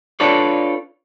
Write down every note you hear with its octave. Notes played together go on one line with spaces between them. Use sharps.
D4 F4 A4 B4 C#5 D5